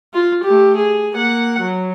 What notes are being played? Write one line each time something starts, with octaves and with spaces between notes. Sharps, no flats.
F4
A3 G4
G#4
A#3 F#5
F#3